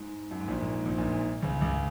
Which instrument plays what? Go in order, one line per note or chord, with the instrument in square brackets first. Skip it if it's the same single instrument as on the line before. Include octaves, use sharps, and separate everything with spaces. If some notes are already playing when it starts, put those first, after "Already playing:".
Already playing: [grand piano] G#2
F#2
G#2
A#1 A#2
G#2
G#2
A#1 A#2
A#1 A#2
G#2
C#2 C#3
C#2 C#3